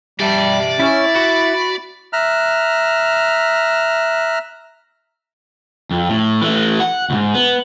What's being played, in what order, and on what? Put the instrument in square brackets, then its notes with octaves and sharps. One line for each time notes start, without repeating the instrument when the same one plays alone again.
[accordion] G3 [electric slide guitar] G4 E5 A5 [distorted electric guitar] D5
[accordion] C#4 [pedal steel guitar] E4
[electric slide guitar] F#4 [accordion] B5
[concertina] E5 A#5 F6 F#6
[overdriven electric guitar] F2
A2
E3 A3
F#5
D2 G#2
B3